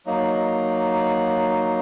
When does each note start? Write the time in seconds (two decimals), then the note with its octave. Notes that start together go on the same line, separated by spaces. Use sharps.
0.06 F#3 A#3 D#4